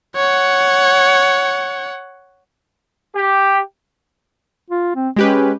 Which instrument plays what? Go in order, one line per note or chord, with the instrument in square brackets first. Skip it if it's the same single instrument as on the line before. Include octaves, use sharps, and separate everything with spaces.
[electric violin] C#5 F#5
[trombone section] G4
[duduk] F4
C4
[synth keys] G#3 G4 B4 [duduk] C#4